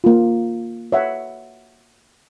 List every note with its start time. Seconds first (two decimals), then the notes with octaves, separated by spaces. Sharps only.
0.04 A#3 F4
0.92 C#5 E5 F#5